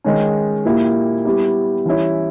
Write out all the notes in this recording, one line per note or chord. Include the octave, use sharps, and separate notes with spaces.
D#3 G#3 C#4
A#2 A#3 E4 G4
G3 B3 E4 G4
E3 G3 C#4 E4